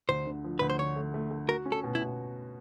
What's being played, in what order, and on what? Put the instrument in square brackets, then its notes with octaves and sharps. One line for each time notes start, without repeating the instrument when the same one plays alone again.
[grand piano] D2 [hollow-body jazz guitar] C5
[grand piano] D3
F3
[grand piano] D2 [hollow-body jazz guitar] B4
[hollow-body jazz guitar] C5
[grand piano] D3 [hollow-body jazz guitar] C#5
[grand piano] A3
A3
A3
[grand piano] F#4 [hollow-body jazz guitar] A#4
[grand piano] C#4
[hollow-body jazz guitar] A4
[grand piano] B2
[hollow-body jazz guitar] E4
[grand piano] B2